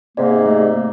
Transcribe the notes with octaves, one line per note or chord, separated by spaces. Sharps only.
G#2 C3 A#3 D5
A3